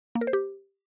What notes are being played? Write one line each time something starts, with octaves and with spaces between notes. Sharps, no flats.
A#3
A#4
C5
G4